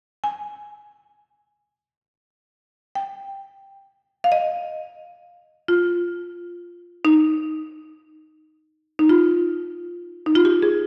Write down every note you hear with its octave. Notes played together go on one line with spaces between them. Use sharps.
G#5
G5
F5
D#5
F4
D#4
D#4
F4
D#4
F4
G4
G#4